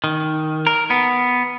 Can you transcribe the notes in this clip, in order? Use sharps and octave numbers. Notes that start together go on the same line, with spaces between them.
D#3
A#4
B3